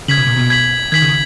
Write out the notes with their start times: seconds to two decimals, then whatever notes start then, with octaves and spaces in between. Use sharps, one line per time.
0.08 C#3 G#6 B6 F#7
0.18 B2
0.27 A#2
0.36 B2
0.50 G#6 B6 F#7
0.92 D#3 G#6 B6 F#7
1.02 C#3